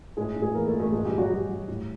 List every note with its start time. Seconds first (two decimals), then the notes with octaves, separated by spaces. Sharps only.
0.17 A2 G#3 G#4
0.36 A2
0.42 G#3 G#4
0.54 E3 A#3 A#4
0.67 A3 A4
0.73 E3
0.80 A3 A4
0.92 A#2 G#3 G#4
1.05 G3 G4
1.12 A#2
1.18 F#3 F#4
1.31 F#3 G3 G4
1.49 F#3
1.68 A2